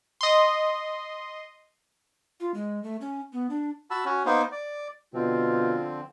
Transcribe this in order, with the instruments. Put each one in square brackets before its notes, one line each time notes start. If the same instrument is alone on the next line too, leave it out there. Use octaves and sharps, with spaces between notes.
[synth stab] D#5 C6
[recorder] F4
G#3
A3
C#4
B3
D4
[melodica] F#4 A5 B5 E6
C#4 F#4
A#3 B3 D#4 C5
D5
[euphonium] B2 [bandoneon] D3 F3 C4 [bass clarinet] F4